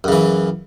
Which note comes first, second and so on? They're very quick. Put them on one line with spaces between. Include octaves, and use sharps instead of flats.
F#2 C#3 E3